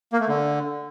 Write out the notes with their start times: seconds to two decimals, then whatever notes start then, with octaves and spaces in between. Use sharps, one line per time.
0.12 A#3
0.20 A3
0.28 D3